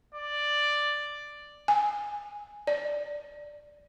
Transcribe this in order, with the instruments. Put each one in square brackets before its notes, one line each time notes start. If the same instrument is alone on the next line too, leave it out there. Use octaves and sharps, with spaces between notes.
[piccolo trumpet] D5
[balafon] G#5
D5